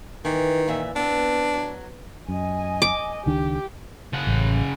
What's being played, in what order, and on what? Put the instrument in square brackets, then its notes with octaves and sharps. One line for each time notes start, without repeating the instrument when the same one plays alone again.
[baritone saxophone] D#3 [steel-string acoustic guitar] E3
[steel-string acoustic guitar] A#2 E3 E5
[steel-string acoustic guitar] B3 C4 [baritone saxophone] D4
[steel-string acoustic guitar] F#3
[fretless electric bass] F#2 [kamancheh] D#5 G#5
[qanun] D6
[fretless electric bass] C#2 D#3 D4 [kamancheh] G4
[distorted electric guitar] C#3 F#5
[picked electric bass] A1